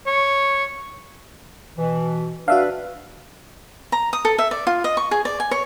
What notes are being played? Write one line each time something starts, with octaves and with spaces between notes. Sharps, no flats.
C#5
B2 E3
D4 F#4 B4 E5 F5
A#5
D#6
A4
E5
D5
F4
D#5
C#6
G#4
D5
G#5
C#5